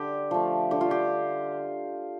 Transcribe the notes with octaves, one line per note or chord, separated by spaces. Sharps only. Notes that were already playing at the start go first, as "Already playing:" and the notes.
Already playing: D3 G4
F3 A3
D3 G4
F4
G4